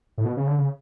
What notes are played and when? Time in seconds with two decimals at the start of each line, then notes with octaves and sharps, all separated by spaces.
0.18 A2
0.25 B2
0.37 C#3
0.47 D3
0.58 C#3